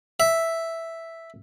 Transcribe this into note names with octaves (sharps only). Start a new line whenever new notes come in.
E5